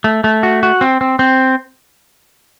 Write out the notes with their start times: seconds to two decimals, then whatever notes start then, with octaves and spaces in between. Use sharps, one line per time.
0.04 A3
0.24 A3
0.43 F#4
0.63 F#4
0.81 C4
1.01 C4
1.19 C4